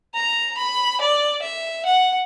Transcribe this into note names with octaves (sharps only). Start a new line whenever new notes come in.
A#5
B5
D5
E5
F#5